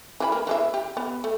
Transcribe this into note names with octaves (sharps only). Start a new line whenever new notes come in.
E3 E4 B5
A#3
E3 G#3 E5
G4
B3
A3